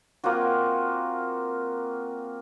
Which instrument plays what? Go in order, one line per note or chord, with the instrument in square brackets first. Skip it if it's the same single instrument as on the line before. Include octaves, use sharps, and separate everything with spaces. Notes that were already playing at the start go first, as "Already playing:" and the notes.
[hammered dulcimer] A#3 C4 F4 F#4